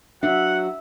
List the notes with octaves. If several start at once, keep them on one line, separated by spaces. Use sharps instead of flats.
F#3 D4 F#4 E5 F#5